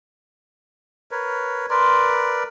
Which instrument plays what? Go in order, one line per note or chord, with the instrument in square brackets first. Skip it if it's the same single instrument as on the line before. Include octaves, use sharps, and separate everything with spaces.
[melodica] A#4 B4 C#5
[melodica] A#4 B4 D5 [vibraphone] C6